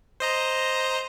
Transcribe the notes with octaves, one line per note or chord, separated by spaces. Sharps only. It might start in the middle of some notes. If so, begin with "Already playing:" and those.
C5 D#5 A#5